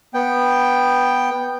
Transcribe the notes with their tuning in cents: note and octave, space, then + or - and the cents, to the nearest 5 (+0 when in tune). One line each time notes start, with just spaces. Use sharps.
B3 -5 G5 +0